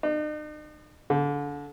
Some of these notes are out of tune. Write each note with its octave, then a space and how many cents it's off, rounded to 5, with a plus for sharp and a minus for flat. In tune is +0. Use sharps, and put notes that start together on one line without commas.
D#4 -45
D3 -25